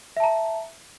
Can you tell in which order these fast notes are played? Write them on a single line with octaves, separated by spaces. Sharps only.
E5 A5 A#5